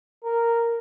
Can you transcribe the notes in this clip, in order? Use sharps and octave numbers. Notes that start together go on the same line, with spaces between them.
A#4